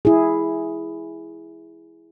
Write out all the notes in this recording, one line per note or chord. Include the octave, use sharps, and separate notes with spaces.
E4 G#4